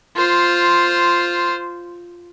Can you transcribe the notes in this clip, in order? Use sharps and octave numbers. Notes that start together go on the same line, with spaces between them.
F4 C5